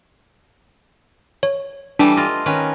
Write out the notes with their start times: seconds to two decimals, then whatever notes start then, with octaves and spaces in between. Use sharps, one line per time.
1.43 C#5
1.99 E3 G3 A3 D4
2.17 F4 D#5
2.46 D#3 C#4 B4